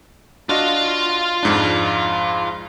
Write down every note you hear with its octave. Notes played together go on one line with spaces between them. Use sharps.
D4 F4 F#4 D#5 F5
F2 G#2 D4